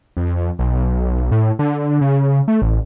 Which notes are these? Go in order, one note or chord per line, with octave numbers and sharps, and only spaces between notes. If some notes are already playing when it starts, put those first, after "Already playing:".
F2
B1
A2
D3
C#3
A3
A1